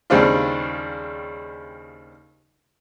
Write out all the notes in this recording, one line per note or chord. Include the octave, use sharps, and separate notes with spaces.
D#2 C#3 G3 C4 D4 F4